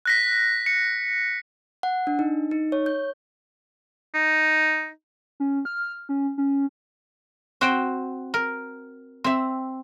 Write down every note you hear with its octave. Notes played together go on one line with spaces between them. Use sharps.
F#6 A#6 B6
C#7
F#5
D4
D#4
D#4
C#5
G6
D#4
C#4
F6
C#4
C#4
C4 F#4 C5 G5
A#4
C4 E5